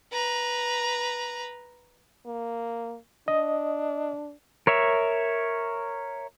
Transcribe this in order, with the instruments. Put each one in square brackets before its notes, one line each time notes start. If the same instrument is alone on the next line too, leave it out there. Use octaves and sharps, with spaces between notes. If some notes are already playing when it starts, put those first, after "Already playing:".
[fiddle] B4 A#5
[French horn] A#3
[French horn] D4 [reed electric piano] D#5
[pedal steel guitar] A#4 C#5 E5